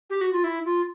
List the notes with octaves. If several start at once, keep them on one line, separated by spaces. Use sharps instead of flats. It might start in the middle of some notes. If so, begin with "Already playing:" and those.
G4
F#4
F4
E4
F4